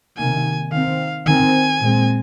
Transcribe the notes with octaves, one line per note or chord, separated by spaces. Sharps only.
C3 D#3 A#3 G#5
D#3 C4 F5
D#3 C4 G#5
A#2 G#3 C4